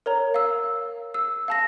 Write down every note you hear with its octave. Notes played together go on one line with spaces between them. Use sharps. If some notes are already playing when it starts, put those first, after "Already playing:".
A#4 C#5 A#5
F5 E6
E6
F5 A5 A#6